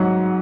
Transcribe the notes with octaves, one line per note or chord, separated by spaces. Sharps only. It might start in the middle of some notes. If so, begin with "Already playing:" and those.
Already playing: G#2 F#3 F#5